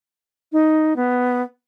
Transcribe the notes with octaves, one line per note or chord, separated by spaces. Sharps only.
D#4
B3